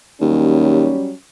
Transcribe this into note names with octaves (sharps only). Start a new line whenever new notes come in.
D#2 F#3 G3 C#4